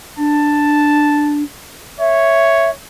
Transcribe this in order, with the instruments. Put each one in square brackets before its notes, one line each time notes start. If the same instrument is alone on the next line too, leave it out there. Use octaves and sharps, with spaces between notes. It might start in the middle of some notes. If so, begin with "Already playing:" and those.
[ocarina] D4 [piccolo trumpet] A5
[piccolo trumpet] C#5 [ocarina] E5